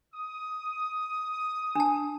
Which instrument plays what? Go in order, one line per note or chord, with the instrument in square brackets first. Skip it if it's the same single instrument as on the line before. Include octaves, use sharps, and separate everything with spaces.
[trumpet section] D#6
[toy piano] D4 A5